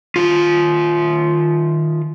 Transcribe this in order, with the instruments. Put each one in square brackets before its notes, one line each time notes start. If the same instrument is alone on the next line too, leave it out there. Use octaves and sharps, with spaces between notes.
[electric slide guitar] D#3 F4